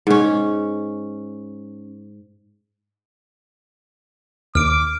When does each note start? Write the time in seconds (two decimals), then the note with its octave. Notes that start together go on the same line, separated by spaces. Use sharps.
0.07 G#2 C#4
4.55 D#2 D6 F6 D7